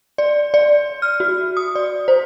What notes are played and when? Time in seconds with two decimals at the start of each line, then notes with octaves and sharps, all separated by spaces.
0.18 D5
0.54 D5
1.02 F6
1.20 F#4
1.57 D#6
1.75 D5
2.08 C5